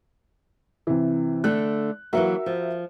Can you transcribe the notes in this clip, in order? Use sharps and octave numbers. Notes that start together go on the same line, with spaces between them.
C3 E3
D3 A3 F#6
E3 F#3 A#3 F#4 A#4 E5
F3